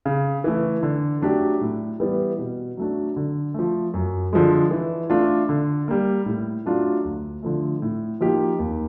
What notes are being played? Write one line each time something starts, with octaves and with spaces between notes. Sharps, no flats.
C#3
E3 A3
D3
F#3 A3 D4 G4
A2
E3 G3 B3
B2
F#3 A3 D4
D3
F3 A3
F#2
D3 F3 G#3
E3
A3 D4 F4
D3
G3 A#3
A2
F#3 A3 D4 F4
D2
D3 F3 A3
A2
F3 A#3 D#4 G4
D#2